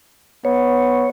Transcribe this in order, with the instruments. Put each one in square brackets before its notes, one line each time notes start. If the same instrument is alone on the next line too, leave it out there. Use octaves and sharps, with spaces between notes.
[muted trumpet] B3 [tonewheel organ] C#5